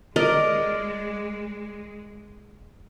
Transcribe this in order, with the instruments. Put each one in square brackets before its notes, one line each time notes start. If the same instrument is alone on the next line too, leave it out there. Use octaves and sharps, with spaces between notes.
[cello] G#3 [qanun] A#4 D5 D#5